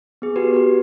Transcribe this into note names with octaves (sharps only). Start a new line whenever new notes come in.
B3 G#4
F#4 G4 B4
G4 B4